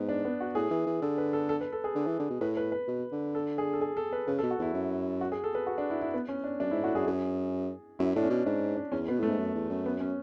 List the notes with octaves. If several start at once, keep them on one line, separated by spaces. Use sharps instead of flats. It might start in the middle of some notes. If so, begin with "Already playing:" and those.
Already playing: G#2 B3
D4
B3
F#4
A2 G#4
E3
E3
D3 A4
B4
A4
A4
B4
A4
G#4
D3
E3
D3
B2
A2 B4
B4
B4
B2
D3
A4
G#4
A4
G#4
A4
B4
C#3 B4
A4
B2
F#4
E2 E4
F#2
F#4
G#4
A4
B4
F#4
D4
E4
E4
B3
C#4
D4
F#2 D4
G#2 E4
A2 F#4
F#2 G#4
F#2 G#4
F#2 E4
A2 D4
C#4
B2
G#2 D4
D4
E2 C#4
B2 B3
A2 A3
G#2
F#2
E2
F#2
B3
C#4